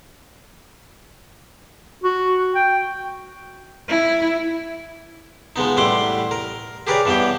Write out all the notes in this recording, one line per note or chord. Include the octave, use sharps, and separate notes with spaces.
F#4
G5
E4
F3 G#3 B3 D#4
A1 G3 E4 F#5 C6 D6
A#4
G4 G#4 A#4 B4 C#5 D5
G2 E3 B3 G4 G5